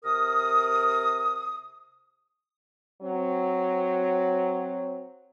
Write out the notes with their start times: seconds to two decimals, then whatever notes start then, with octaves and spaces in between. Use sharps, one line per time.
0.04 C3 A#4 D#6
3.02 F#3 C4